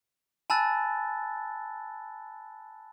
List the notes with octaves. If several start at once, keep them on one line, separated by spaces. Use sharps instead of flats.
G#5 A5 B5 E6 F#6 A6